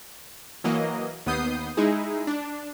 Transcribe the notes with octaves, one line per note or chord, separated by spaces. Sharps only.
E3 F#3 A#3 D#5
D#2 B3 D#6 G6 C7
G#3 D#4 E4 G#4
D4